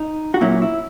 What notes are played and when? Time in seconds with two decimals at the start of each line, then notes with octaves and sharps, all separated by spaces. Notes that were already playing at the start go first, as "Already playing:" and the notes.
Already playing: D#4
0.34 F#4
0.41 A#2 F#3 C#4 E4
0.62 E4